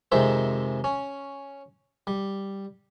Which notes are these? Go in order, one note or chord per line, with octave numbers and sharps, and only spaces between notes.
F2 C3 D#3 G#3 C5 E5
C#4
G3